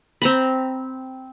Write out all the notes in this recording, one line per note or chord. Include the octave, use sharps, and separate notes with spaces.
C4 A#5 B5